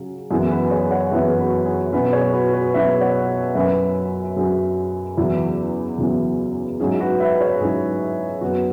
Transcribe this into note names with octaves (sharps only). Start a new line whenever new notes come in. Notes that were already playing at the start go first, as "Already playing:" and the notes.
Already playing: C#3 F#3
F#2 E3 B3 E4 G#4
F#4 B4
G#4 C#5
C#5 F#5
F#2 E3 B3 E4 B4 E5
G#4
F#4 B4
G#4
B2 F#3 C#4 E4 F#4 B4
G#4 C#5
F#4 B4
F#4 B4
B2 F#3 C#4 E4 B4 E5
C#5 F#5
F#2 F#3 C#4 B4 E5
F#2 F#3 C#4 G#4
E2 C#3 F#3 B3 E4
E2 C#3 F#3 B3 E4
G#2 F#3 C#4 E4 G#4
F#4 B4
B4 E5
G#4 C#5
G#2 F#3 C#4 E4 G#4
F#2 F#3 B3 F#4